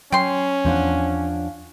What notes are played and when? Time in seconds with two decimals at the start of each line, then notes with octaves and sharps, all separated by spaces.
0.12 F#3 C#4 G5 C6
0.65 E2 F3 D4 F#5